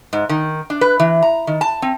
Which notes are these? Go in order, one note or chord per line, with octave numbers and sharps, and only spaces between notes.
G#2
D#3
D4
B4
E3
A#5
D#3
A5
C4